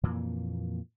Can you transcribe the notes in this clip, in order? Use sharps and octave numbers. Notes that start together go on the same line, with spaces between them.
F2 A#2 E3 A#3